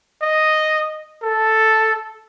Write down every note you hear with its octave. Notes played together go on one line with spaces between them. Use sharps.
D#5
A4